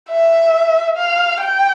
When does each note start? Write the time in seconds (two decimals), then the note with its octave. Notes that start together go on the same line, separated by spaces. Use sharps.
0.10 E5
0.97 F5
1.41 G5